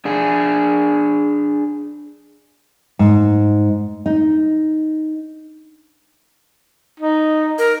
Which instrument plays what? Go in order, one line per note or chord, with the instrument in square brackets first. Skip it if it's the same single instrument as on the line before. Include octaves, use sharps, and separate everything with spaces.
[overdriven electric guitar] D4 G#4
[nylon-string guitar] G#2
D#4
[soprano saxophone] D#4
[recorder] A#4